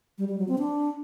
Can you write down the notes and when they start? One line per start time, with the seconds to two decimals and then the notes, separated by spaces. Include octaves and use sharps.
0.18 G3
0.28 G3
0.38 F#3
0.48 C4
0.58 D4